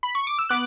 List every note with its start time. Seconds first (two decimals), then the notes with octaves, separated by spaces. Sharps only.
0.03 B5
0.15 C#6
0.27 D6
0.39 E6
0.49 B3 D6 F#6